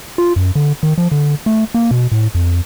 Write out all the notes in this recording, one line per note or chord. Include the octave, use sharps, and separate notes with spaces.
F4
F#2
D3
D#3
F3
D3
A3
A#3
B2
A2
F2